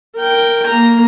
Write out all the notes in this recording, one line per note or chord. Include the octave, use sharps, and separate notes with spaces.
A#4 G5
A#3 A#5